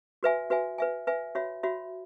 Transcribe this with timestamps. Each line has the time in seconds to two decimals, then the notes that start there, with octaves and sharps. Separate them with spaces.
0.23 F#4 B4 E5 G#5
0.50 F#4 B4 E5 G#5
0.78 B4 E5 G#5
1.07 B4 E5 G#5
1.35 F#4 C#5 E5 B5
1.63 F#4 C#5 E5 B5